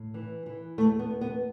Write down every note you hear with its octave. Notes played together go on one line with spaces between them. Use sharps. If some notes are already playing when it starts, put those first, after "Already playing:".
Already playing: A2
E3
E3
E2 A3
B3
E2
B3